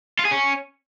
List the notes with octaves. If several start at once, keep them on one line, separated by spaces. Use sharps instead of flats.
F4
G#4
C#4